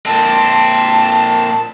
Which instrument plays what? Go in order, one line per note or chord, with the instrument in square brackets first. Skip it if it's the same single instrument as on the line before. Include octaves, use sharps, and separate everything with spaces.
[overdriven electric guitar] A#2 C4 [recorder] A5